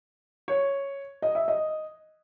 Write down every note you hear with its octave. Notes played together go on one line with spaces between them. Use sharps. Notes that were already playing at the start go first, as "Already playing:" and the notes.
C#5
D#5
E5
D#5